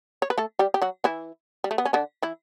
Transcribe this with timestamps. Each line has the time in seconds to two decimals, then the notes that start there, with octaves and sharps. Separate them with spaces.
0.22 C#5
0.30 B4
0.38 A3 A4
0.59 G3 G4
0.74 G4
0.82 F#3 F#4
1.04 E3 E4
1.64 G3
1.71 A3
1.78 B3
1.85 C#4
1.93 D3 D4
2.23 E3 E4